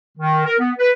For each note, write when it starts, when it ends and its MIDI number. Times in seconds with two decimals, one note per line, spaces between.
0.18 0.42 51
0.46 0.55 70
0.60 0.71 59
0.79 0.91 71